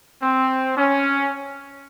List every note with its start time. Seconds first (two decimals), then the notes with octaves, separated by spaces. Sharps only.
0.23 C4
0.76 C#4